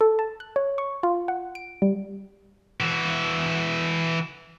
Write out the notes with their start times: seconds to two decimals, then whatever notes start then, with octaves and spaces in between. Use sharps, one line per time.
0.01 A4
0.19 A5
0.40 F#6
0.56 C#5
0.78 C#6
1.03 F4
1.28 F#5
1.55 D7
1.82 G3
2.80 E3 F#4